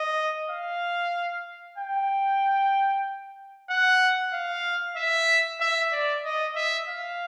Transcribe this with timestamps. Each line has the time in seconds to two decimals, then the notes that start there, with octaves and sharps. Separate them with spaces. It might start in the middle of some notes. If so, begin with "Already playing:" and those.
Already playing: D#5
0.50 F5
1.78 G5
3.69 F#5
4.33 F5
4.96 E5
5.60 E5
5.92 D5
6.25 D#5
6.56 E5
6.88 F5